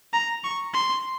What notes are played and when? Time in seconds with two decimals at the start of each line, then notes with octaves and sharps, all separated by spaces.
0.13 A#5
0.44 C#6
0.74 C6